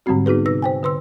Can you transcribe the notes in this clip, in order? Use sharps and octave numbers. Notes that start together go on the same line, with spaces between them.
G#2 D3 G3 G#3 C4 F#4
B3 D#4 F#4 G#4 B4
C3 D#4 B4 E6 A#6
C5 G5 G#5
D3 B4 C6 E6